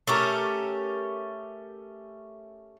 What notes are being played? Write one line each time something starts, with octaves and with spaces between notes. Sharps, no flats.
A3 C#4 G4 A#4